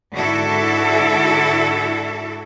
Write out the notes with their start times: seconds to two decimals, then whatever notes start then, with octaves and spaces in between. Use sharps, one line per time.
0.15 G#2 D3 E4 F#4 A4 E5